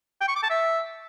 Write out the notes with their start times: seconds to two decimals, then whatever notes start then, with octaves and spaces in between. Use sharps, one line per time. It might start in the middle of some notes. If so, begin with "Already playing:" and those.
0.21 G5
0.28 C#6
0.36 D6
0.43 A5
0.50 E5